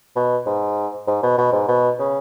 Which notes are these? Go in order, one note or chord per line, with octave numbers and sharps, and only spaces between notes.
B2
G#2
G#2
B2
B2
G#2
B2
C#3